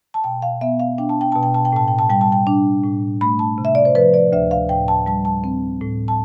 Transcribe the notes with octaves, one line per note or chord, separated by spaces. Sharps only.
A5
B2 G5
F5
B3 E5
F5
D4 G5
A5
G5
B2 A5
G5
A5
G5
A2 A5
G5
A5
G3 G5
A5
G5
D4
A2
A3 B5
A5
C3
E5
D5
C5
F3 B4
D5
D2 E5
F5
A2 G5
A5
G3 A5
A5
C4
A2
A5